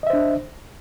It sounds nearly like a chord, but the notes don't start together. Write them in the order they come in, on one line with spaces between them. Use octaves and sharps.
D#5 E5 C5 D4